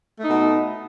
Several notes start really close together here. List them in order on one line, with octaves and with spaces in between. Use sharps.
A3 D#4 B2